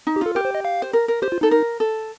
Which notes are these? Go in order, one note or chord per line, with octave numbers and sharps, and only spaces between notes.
D#4
G4
F4 A4
G4 A#4
C5
D#5
F5
C5
A#4
A#4
G4 C5
F4
D#4 A4
A#4
A4